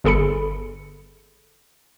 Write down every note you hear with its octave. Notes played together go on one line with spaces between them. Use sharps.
G1 G#4 A4 B5 C#7